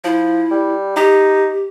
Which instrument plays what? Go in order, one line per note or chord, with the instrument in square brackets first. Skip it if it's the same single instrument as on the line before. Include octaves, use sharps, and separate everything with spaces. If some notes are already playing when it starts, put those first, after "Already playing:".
[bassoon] F3 [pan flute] E4
[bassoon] G3
[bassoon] D#4 [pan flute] G4